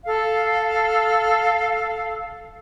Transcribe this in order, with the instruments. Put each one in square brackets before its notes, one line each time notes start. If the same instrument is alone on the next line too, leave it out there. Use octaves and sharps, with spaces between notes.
[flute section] A4 F5